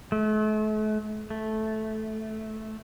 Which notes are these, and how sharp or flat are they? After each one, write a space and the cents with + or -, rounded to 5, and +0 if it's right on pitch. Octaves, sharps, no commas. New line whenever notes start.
A3 -40
A3 -10